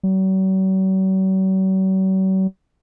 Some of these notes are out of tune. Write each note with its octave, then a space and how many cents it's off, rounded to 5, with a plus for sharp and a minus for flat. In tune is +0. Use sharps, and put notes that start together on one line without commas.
F#3 +45